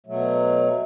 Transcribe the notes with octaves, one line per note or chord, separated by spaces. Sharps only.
B2 F#3 A3